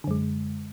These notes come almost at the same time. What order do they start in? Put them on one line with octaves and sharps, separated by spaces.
D3 F#2 G#3